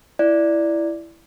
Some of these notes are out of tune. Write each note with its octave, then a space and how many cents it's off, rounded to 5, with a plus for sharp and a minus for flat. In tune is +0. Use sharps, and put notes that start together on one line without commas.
E4 +10 D5 +0